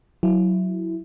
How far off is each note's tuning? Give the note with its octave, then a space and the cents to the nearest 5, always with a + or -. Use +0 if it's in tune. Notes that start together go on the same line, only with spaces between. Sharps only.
F#3 +0 E4 +0